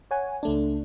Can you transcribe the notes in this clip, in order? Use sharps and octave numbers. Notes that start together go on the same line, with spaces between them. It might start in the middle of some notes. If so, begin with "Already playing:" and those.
C#5 F#5 G#5
C#2 A3 D4